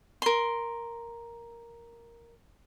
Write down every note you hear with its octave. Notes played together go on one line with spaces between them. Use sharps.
A#4 C6